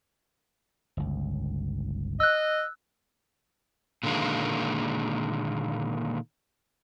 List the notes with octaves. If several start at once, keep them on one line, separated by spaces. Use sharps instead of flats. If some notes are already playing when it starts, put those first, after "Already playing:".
G1 C#2
D#5 E6 F#6
A#2 D3 D#3 G#3 A#3